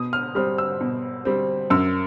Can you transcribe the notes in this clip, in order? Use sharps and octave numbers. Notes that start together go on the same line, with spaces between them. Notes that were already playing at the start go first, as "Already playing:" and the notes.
Already playing: B2 D#6
F6
G3 C4 F6
E6
B2
G3 C4
F#2 E6